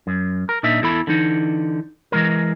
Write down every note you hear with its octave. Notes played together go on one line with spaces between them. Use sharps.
F#2
A#4
A#2 D4 D#4 E5
E2 E3 A4 B5
D3 E3 D#4
E3 G#3 A#4